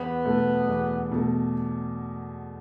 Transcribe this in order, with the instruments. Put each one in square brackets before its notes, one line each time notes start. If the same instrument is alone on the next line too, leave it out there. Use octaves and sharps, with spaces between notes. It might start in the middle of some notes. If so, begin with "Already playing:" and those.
Already playing: [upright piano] E2 [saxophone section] B3
[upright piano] B2 A3
E2
B2 A3